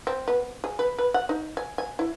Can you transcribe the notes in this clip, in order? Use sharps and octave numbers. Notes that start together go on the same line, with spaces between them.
C4
B3
G#4
B4
B4
F#5
D#4
G#5
G#5
E4